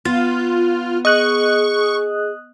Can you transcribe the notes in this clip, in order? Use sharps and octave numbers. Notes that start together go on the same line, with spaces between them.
B3 F4
G#4 D#5 C#6 D#6 F#6